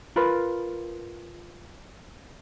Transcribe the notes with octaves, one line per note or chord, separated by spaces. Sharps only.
F4 A#4 B4